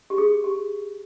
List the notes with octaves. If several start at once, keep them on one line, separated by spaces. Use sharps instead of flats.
G4
G#4
G4